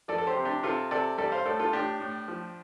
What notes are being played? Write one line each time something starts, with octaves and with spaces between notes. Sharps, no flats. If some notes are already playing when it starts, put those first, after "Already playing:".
F3 A4 D5
A4
G4 C5
C3
D4 G4
C3 F4 A4
C3 A4 D5
G3 A4 D5
C5 F5
A2 A4 D5
F4 A4
A2 D4 G4
A2
F3